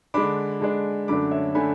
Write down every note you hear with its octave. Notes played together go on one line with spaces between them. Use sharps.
D3 G#3 D4 B5 D6
D3 G#3 D4
F#2 D3 A3 D4 B5 D6
C#5 E5
D3 A3 D4 G#5 B5